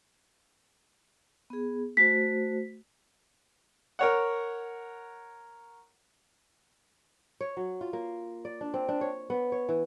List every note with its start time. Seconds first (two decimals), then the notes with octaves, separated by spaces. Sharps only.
1.50 B3 G#4
1.97 A3 F#4 C5 B6
3.99 A#4 C#5 F#5
7.41 C#5
7.57 F#3
7.81 F4
7.93 A#3
8.45 D5
8.61 D4
8.74 C4
8.89 D4
9.01 C#5
9.30 B3
9.52 C#5
9.69 E3